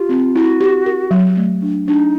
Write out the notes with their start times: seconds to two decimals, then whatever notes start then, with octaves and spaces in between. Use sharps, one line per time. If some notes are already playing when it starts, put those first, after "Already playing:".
Already playing: F4 G4
0.09 C4
0.35 E4 F#4
0.60 G4
0.86 A#4
1.11 F#3
1.37 A3
1.62 D4
1.87 D4 D#4